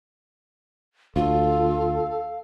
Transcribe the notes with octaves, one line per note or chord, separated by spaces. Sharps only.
D2 F4 A4 F5